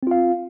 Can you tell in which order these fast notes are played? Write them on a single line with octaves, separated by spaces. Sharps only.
C4 F4 F5